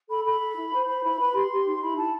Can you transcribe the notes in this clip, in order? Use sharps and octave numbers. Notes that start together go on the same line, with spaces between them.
A4 B5
A4 B5
A4
E4
C5
C5 B5
E4 B5
B4 B5
G4 C6
G4
D#4
E4 B5
E4 A5